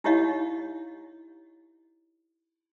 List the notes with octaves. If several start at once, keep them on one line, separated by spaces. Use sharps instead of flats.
D#4 E4 G4 C#5 D#5 F5